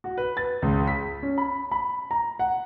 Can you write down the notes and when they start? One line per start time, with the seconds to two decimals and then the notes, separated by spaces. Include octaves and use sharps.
0.04 F#4
0.18 B4
0.37 A6
0.62 C#2
0.87 B6
1.23 C#4
1.38 B5
1.72 B5
2.11 A#5
2.39 F#5